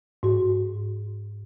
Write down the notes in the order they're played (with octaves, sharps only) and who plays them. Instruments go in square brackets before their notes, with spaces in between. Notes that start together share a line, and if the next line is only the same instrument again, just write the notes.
[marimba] G#2 F#4